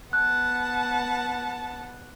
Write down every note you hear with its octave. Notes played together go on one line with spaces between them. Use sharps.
B3 F#5 A5 F#6